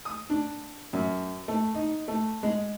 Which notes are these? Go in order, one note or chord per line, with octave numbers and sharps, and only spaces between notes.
D#6
D4
F#2
A3
D#4
A3
G#3